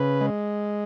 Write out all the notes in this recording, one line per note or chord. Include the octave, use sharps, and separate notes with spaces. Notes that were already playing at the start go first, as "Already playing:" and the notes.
Already playing: C#3 B4
G#3